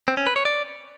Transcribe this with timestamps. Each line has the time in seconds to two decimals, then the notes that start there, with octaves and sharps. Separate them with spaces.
0.08 C4
0.17 C#4
0.27 B4
0.36 C#5
0.45 D5